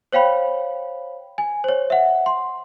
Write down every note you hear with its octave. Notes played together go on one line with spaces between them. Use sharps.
C5 C#5 F5 G5 B5
G#5
C5 C#5
E5 F#5
C6